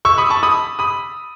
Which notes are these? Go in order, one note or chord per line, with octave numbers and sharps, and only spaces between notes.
C#6 E6
B5 D#6
A5 C#6
B5 D#6
B5 D#6